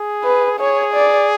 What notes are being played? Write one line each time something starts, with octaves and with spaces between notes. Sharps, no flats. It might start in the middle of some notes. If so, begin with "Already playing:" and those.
Already playing: G#4
B4
G#4 C#5
D5